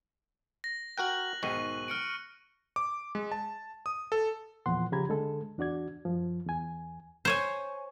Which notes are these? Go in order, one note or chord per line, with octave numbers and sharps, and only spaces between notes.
A#6
F#4 A#4 G5 F#6 F#7
B1 G#2 D#3 C#6 D#7
F6 C#7 D7
D6
G#3
A5
D#6
A4
E2 A#2 F3 F#5 C6
C#3 F3 G4 A#5 B5 G#6
D2 D3 G#3 A4
E2 D4 F#4 D5 G#6
F#2 F3
E2 G#5
C5 C#5 G#5